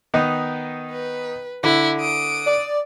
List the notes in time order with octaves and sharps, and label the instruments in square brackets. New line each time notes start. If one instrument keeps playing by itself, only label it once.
[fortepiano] D#3 B3 D#4
[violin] B4
[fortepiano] D3 [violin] E4
[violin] D#6 D7
[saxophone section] D5